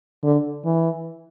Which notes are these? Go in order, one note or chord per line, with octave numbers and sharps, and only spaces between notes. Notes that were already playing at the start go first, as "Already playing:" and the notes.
D3
E3